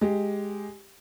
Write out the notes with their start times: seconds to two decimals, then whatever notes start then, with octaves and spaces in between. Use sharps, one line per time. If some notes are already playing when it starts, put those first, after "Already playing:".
0.01 G#3 G4